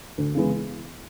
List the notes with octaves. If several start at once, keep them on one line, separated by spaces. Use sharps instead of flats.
D2
C#3 E3 G#3 B3